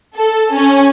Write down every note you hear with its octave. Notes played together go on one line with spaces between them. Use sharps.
A4
C#4